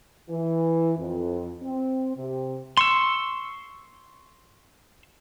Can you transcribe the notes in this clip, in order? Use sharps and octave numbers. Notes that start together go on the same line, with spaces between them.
E3
F2
C4
C3
C6 C#6 E6